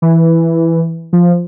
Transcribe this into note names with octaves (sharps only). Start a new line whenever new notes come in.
E3
F3